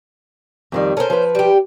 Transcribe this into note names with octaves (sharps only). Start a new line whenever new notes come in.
F2 D#3 G3
C#4 A4 A#4 C5
F3 B4
G3 G4